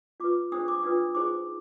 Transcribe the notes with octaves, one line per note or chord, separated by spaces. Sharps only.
F4 B4 D6
D4 G#4 C5 D#6
D6
D4 F4 B4 D#6
D#4 G#4 C5 D6